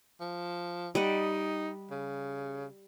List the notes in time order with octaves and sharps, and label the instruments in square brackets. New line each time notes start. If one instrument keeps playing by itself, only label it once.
[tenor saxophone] F3
[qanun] G3 D#5 F#5 [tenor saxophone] D#4
[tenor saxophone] C#3